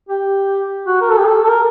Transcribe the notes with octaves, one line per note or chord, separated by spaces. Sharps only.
G4
F#4
A#4
A4
G4
A4
A4
A#4